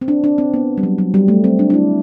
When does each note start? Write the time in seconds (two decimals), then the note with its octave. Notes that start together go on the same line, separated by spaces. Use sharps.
0.01 C4
0.08 D4
0.24 D4
0.38 C4
0.54 B3
0.78 G3
0.83 F#3
0.98 F#3
1.14 G3
1.28 A3
1.44 C4
1.59 D4
1.70 D4
1.74 E4